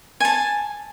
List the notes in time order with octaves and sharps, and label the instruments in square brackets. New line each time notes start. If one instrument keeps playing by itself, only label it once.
[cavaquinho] G#5 A5